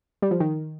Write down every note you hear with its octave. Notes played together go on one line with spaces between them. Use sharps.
G3
F3
D#3